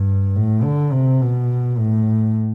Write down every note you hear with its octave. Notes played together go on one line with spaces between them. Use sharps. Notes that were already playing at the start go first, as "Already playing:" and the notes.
Already playing: G2
A2
D3
C3
B2
A2